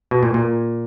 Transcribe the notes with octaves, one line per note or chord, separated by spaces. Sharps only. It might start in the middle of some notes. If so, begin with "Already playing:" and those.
B2
A#2
A#2